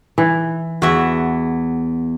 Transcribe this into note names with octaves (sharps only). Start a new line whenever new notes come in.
E3
E2 F#4 E5